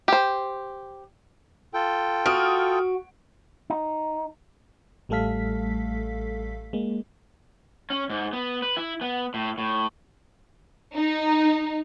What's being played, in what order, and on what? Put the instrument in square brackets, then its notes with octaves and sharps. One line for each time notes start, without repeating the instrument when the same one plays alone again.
[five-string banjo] G4 C5
[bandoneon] F4 A4 G5
[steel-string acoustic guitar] F#4 [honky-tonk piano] D#6 F6 D7
[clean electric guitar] D#4
[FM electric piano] A1 G3 A3 A4 F5 B6
G#3 A#3
[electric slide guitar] C#4
G#2
B3
B4
E4
B3
A2
A2
[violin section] D#4